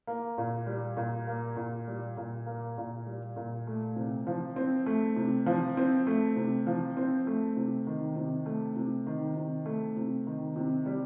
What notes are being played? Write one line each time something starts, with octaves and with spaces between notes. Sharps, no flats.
A#3
A#2
G3
A#2
A#3
A#2
G3
A#2
A#3
A#2
G3
A#2
A3
C3
F3
C4
A3
C3
F3
C4
A3
C3
F3
C4
A3
C3
D#3
C3
A3
C3
D#3
C3
A3
C3
D#3
C3
G3